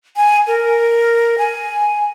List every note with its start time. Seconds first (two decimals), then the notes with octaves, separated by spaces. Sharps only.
0.16 G#5
0.47 A#4
1.38 G#5